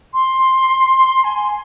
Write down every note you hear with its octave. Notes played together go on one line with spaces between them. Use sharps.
C6
G#5